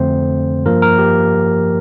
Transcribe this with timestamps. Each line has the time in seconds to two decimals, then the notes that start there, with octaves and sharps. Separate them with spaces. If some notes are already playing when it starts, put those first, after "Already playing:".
Already playing: F2 D3 A3 C4 C5
0.65 G2 F3 A#3 A#4
0.82 A#4
0.98 G4